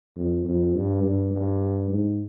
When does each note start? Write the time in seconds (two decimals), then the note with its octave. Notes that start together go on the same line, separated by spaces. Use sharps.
0.16 F2
0.45 F2
0.74 G2
1.04 G2
1.33 G2
1.91 G#2